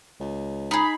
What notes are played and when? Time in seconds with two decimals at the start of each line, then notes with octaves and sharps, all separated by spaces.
0.20 C#2
0.71 D#4 G#4 B5